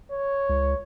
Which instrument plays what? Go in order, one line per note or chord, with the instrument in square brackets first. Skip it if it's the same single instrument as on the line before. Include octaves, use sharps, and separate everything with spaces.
[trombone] C#5
[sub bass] C#2